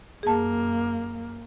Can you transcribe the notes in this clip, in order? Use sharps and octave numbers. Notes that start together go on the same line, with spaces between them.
F#2 A#3 G#4 A5